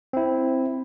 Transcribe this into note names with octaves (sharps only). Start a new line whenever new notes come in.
C4 E4